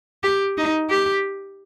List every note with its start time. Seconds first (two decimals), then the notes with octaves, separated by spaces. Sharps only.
0.24 G4
0.58 D#4
0.90 G4